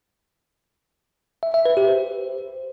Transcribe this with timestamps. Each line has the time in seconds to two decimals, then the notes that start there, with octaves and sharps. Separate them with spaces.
1.43 E5
1.54 E5
1.66 B4
1.77 G4
1.88 C5